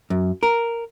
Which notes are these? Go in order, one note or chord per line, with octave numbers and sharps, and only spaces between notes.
F#2
A#4